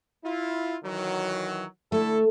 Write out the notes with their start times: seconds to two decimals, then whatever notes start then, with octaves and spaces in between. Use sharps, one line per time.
0.24 E4 F4
0.83 D#3 E3 F#3
1.92 D3 A3 E4 A4